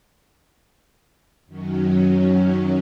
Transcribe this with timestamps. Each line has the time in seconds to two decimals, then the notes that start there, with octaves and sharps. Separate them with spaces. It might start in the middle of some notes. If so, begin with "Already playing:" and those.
1.47 F#2 D#3 F#3 C#4